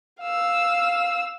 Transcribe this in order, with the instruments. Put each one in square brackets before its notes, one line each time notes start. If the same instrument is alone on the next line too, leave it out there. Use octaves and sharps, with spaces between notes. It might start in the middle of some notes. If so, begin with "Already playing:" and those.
[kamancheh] F5 E6